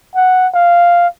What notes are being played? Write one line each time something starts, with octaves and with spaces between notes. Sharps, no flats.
F#5
F5